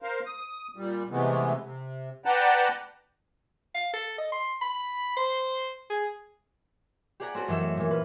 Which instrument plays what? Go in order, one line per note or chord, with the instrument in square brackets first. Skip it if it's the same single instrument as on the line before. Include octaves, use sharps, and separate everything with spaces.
[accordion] A#4 C5 F5
D#6
A#2 G3
C3 E3 G#3 A3 B3
C3
B4 D5 F#5 G5 A5 A#5
[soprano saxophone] F5
A4
D#5
C6
B5
C5
G#4
[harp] G4 G#4 D5 F#5 A#5
C4 C#4 F#4 A4
F#2 E3 D#4 G4 A4 E6
A3
A#2 E3
B4 F6